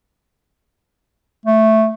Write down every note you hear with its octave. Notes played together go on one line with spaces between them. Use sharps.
A3